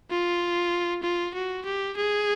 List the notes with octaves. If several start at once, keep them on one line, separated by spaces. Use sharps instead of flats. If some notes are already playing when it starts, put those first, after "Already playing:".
F4
F4
F#4
G4
G#4